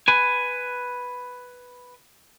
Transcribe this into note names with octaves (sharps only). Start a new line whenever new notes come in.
B4 G#5